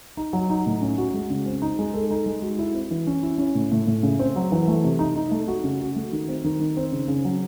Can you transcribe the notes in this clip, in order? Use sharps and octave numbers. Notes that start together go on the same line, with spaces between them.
D#4
F#3
D#4
A2
C#4
F#4
G#3
C#3
C4
D#4
G#3
A4
D#4
G#3
F#4
E4
C4
E3
C#4
E4
C#4
A2
A2
A2
C#3
C4
F#3
E3
A3
C3
D#4
D#4
A3
F#4
C#3
F#4
A3
D#3
C4
D#3
D#3
C4
C#3
C#3
F#3